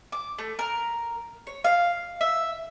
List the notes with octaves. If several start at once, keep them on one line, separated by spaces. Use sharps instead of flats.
D6
A3
A#4
C#5
F5
E5